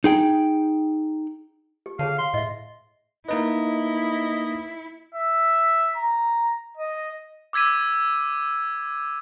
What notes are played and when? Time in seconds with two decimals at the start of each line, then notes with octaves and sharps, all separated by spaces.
0.04 D#4 G#4 G5
1.86 G4
1.99 D3 G#4 C#5 F5 A5
2.18 F5 C6
2.34 A2 D#5 E5
3.29 A#3 D#4 E4 B4 D#5
5.14 E5
5.96 A#5
6.77 D#5
7.53 D6 E6 G#6 B6 D#7